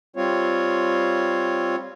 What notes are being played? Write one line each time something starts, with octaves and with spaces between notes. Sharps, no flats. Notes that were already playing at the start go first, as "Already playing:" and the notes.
G3 C4 F4 C#5